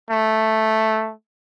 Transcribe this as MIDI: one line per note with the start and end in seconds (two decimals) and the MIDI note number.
0.11 1.13 57